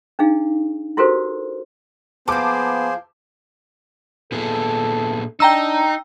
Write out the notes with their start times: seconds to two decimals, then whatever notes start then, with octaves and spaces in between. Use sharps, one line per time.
0.19 D4 D#4 G#4 F5
0.97 E4 F#4 G4 A4 A#4 C5
2.28 F3 A#3 B3 G#4 C5 A5 D6
4.32 A#2 B3 G#4 A4
5.40 D4 D#4 G5 A#5 E6